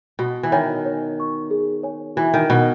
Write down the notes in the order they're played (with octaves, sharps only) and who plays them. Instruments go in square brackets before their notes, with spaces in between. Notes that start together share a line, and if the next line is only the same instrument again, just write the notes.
[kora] B2 [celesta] F#4
[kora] E3
[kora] D#3 [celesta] C#5 G#5 B5
[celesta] C#5
G#5 C#6
G#4
C#5 G#5
[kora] E3 [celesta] F#4
[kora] D#3
[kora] B2 [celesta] B4 F#5 B5